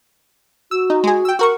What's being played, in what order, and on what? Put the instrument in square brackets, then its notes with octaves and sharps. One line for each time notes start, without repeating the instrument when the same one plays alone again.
[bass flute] F#4 [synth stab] E6
[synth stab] D#4
G#3 G#4
G5 E6
F#4 A#4 C#6